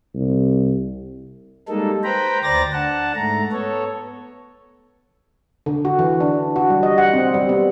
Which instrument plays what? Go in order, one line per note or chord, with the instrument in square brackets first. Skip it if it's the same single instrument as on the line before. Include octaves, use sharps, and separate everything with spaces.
[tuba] C2
[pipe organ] G3 G#3 A#3 D#4 A4
B4 C5 G5 A#5 B5
D2 C5 D5 A#5 A6 A#6
D4 F#5 A5
G#2 A3 A#5
B3 A4 C#5
[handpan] D3
F#4
E3
D4
F#4
G3
D#5
F#5
C4
G3
B3